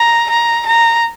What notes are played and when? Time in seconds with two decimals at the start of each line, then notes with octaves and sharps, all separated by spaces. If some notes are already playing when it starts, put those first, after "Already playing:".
Already playing: A#5
0.30 A#5
0.66 A#5